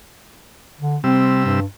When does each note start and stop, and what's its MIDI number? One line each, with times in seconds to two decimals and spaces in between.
0.79 0.97 50
1.04 1.60 48
1.04 1.60 55
1.04 1.42 60
1.04 1.60 88
1.46 1.65 43